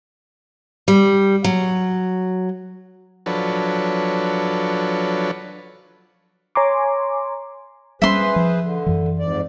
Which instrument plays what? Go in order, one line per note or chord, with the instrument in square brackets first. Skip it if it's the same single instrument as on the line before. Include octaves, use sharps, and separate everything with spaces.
[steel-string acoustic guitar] G3
F#3
[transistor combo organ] F3 F#3 D4 A4 B4 C#5
[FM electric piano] C#5 G#5 A#5 C6 D6
[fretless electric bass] G3 B3 C#4 [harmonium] G#4 B4 C5 [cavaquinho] E5 C6
[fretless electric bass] F3
[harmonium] D3
[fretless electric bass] F#2 E3
[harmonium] F2 G#2 D5